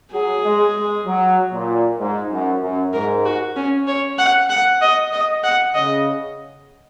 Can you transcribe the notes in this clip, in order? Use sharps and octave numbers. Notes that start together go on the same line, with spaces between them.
F#3 G#4
G#3
G#3
F#3
A#2
G#2
F#2
F#2
G#2 A#4
F#4
C#4
C#5
F#5
F#5
D#5
D#5
F#5
C#3 D#5